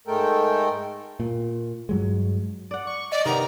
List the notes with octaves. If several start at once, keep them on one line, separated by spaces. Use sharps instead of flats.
G#2 G#3 A3 A4 A#4 G5
A#2
G2 F#3 G#3
D5 F#5
C#6
D5 D#5
C3 D#3 B3 A#5